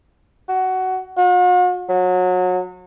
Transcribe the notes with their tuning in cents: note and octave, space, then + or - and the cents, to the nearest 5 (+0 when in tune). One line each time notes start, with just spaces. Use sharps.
F#4 +15
F#4 -45
F#3 -25